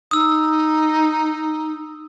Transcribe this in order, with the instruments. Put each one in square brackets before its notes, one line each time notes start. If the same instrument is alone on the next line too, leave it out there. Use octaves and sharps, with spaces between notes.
[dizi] D#4 [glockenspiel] D#6 E6